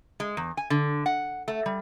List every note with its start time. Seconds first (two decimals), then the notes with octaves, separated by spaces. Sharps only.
0.20 G#3
0.37 E2
0.57 G#5
0.70 D3
1.06 F#5
1.48 A3
1.66 G3